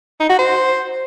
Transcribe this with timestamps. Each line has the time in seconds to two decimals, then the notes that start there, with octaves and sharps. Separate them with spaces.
0.20 D#4
0.29 F#4
0.38 C5